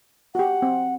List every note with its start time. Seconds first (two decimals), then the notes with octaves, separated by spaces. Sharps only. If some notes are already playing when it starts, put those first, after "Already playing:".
0.35 F#4 G4 F#5
0.62 C4